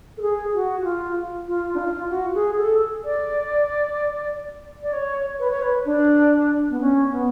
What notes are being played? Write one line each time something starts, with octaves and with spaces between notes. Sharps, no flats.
A4
G#4
F#4
F#4
F4
F4
D4
F4
F#4
G#4
A4
D5
D5
C#5
B4
C#5
B4
D4
B3
C#4
B3